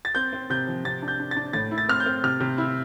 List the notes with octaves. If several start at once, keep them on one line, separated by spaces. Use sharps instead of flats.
A6
C4 G6
C4
C3 G6
F3
C3 A6
D4
G6
D4
A6
D4
A2 A6
E4
A6
C4 F6
G6
C4
C3 F6
C3
E4